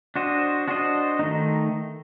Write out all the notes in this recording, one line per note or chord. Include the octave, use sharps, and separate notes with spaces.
D4 F#4 C5 D#5
D4 F#4 C5 D#5
D#3 A3 D#4